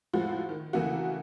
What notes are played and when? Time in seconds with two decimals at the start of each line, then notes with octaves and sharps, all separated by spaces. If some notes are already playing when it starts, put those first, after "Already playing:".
0.13 A2 F3 G#3 F#4
0.49 D#3
0.73 C#3 E3 A3 A#3 F#4